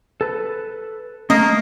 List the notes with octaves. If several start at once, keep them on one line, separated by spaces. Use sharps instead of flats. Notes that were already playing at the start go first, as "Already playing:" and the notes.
A4 B4
A3 A#3 C#4 D#5